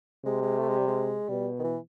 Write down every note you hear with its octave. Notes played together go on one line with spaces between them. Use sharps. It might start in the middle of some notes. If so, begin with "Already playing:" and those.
C3 G#3
G#3
A3
G#3
G3
G#3
B2 G3
D#3
E3